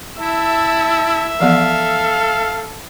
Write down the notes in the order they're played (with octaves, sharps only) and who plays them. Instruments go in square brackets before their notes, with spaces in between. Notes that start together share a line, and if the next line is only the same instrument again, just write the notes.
[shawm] E4 [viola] E5 [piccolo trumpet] A5
[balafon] E3 F3 B3 [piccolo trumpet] A4 [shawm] F5